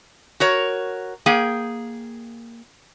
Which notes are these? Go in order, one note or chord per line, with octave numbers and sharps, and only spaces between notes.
F#4 A#4 C#5
A#3 G#4 G5